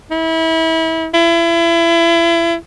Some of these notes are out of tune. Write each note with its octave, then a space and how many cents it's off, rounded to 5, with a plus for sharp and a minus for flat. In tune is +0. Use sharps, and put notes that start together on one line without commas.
E4 -30
E4 +35